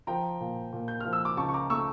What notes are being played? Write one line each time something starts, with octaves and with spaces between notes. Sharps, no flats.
F3 G5 A#5
A#2
A#2
G6
F3 F6
E6
D6
C#2 A5 C#6
C#6
A#5 D6
A3 C#6 E6